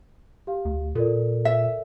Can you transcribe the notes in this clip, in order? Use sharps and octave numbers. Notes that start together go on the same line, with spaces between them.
G4 F5
D2
A#2 A4 A#4 D5
E5